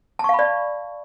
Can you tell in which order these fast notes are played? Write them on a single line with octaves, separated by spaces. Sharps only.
A5 C#6 F5 B5 D5